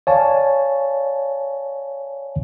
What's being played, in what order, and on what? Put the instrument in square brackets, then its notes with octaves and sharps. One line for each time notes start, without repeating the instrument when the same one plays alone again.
[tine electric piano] C#5 D5 F5 G#5 A5